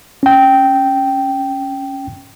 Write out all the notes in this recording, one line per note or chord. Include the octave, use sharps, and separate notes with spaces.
C#4 G5